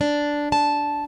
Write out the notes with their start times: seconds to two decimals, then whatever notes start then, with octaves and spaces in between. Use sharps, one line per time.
0.01 D4
0.52 A5